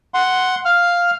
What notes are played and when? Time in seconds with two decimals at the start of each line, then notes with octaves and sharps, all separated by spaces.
0.14 F#5 C6
0.65 F5 F6